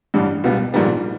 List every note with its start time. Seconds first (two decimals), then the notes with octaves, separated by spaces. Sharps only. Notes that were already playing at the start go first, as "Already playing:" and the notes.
0.14 A1 G2 D3 G3
0.44 C#2 B2 G3 B3
0.74 A#1 G#2 D#3 G3 B3